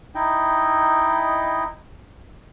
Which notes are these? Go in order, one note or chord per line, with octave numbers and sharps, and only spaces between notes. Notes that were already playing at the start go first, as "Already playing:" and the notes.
D#4 E4 D#5 G5